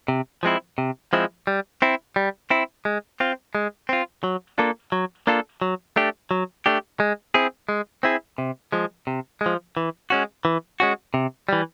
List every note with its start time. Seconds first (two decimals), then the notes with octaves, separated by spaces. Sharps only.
0.08 C3
0.43 F3 G#3 C4 E4
0.78 C3
1.13 F3 G#3 C4 E4
1.47 G3
1.82 C4 E4
2.16 G3
2.50 C4 E4
2.85 G#3
3.20 C4 F4
3.55 G#3
3.89 C4 F4
4.24 F#3
4.58 A#3 D4 F4 A4
4.92 F#3
5.27 A#3 D4 F4 A4
5.62 F#3
5.96 A3 D4 G4
6.31 F#3
6.66 A3 D4 G4
7.00 G#3
7.34 C4 E4 G#4
7.69 G#3
8.03 C4 E4 G#4
8.38 C3
8.72 F3 G#3
9.07 C3
9.41 G#3
9.46 F3
9.77 E3
10.10 G#3 C#4 F#4
10.45 E3
10.80 G#3 C#4 F#4
11.14 C3
11.49 E3 G3